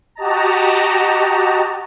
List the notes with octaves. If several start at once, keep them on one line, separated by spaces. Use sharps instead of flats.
F#4 G4 D#5 A5 A#5